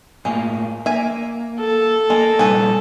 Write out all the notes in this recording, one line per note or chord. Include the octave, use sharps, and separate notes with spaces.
A2 G#3 A#3
A#3 E5 G#5
A4
G#3 A#3
A#2 G3 C4 G#4 B4 C#5